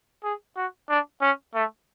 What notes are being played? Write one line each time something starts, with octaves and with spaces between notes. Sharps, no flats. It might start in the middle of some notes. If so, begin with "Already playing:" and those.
G#4
F#4
D4
C#4
A3